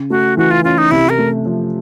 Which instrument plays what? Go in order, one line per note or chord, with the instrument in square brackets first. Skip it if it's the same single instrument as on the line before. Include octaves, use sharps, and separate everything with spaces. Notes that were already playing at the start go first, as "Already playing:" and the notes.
Already playing: [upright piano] C#3
[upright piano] A3 [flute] F#4
[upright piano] E3 [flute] F#4
[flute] F4
[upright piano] C#4 [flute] F4
[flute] D#4
[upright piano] C3 [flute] E4
[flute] A#4
[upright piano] A3
F3